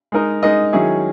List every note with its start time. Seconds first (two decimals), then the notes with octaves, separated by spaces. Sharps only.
0.12 G#3 D#4 A#4 D#5
0.43 G#3 D#4 A#4 D#5
0.72 D#3 F#3 C#4 E4 G#4